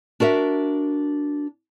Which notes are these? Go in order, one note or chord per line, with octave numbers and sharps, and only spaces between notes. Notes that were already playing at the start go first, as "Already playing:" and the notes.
D4 F#4 A#4 E5